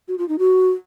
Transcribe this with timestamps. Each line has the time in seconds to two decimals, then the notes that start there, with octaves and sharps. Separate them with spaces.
0.08 F#4
0.18 F4
0.29 D#4
0.39 F#4